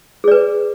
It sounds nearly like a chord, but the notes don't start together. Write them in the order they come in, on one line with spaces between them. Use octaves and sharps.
G#4 D5 B4